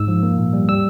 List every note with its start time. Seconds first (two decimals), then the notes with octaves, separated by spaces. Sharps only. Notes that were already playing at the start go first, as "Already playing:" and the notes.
Already playing: G#2 E6
0.08 F3
0.23 A#3
0.38 A#2
0.53 G3
0.69 G3 E6